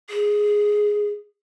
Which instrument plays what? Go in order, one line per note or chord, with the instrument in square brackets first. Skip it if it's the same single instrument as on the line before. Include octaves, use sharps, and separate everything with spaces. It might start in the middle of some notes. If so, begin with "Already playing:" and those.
[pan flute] G#4